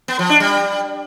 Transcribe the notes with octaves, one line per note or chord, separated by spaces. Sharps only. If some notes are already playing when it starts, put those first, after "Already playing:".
B3
F3
D4
G3